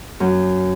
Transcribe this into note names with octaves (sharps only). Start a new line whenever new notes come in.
F#2